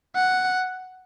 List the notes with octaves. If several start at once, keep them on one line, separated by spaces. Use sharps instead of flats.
F#5